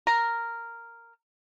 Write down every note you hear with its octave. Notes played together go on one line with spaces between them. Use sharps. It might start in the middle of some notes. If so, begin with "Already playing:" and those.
A#4